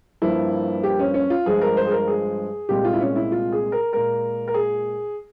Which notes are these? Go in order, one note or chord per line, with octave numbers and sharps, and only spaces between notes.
G2 F3 A#3 E4
G4
C#4
C#4
F4
G2 F3 G#3 G#4
A#4
C5
G#4
A#4
G#4
C2 A#2 G#3 G4
F4
E4
C#4
E4
F4
G#4
A#4
A#2 G#3 A#4
A#4
G#4